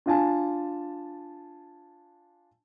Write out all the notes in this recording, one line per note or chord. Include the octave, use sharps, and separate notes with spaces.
D4 F4 G#5 A5